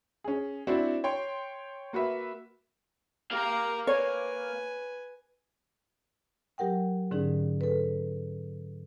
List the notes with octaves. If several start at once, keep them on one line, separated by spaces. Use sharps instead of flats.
C#4 G#4
C4 D4 E4 F#4
C#5 G5 C6
A#3 F#4 B4 E5
A#3 G4 F5 A#5
B4 C#5 G#5
F#3 G4 A#4 F#5 G5
G#2 D3 C#4 D#4 G#4
A4 B4